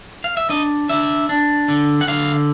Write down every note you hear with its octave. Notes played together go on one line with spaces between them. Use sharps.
F5
E5
D4 D#5
D4 E5
D4
D3
F#5
D3 F5